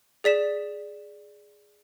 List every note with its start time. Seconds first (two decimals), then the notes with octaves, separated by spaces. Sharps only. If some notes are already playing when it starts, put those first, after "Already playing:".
0.24 G#4 D5 B6 E7